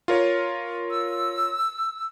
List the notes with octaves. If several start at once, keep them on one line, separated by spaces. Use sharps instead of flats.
F4 A#4 C#5
E6